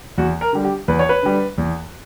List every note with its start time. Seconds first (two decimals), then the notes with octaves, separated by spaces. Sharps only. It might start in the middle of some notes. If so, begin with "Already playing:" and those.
0.18 E2 F#4
0.41 A#4
0.53 D3 G3
0.64 G4
0.88 E2 B4
0.99 C#5
1.09 B4
1.23 D3 G3
1.58 E2